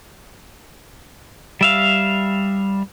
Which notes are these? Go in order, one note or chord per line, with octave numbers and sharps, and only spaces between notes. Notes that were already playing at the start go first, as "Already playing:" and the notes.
G3 E5 F5